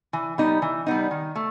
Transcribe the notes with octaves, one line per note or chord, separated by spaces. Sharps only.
E3
G3 B3 D#4
E3
G3 B3 D#4
D#3
A3